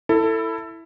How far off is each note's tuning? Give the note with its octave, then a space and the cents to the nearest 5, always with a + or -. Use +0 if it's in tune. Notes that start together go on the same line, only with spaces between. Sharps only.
E4 +0 A4 +20